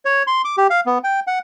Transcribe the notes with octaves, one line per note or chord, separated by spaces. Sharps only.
C#5
C6
D6
G4
F5
B3
G5
F#5